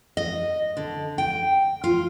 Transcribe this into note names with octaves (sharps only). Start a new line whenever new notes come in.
D#5
D3
G5
F4